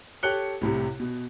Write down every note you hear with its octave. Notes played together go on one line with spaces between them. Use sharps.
G4 A4 C#5 F#6 C#7 G7
C2 A2 C3
B2